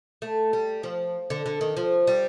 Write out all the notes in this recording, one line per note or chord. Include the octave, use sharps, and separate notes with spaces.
A3
G3
F3
D3
D3
D#3
F3
G3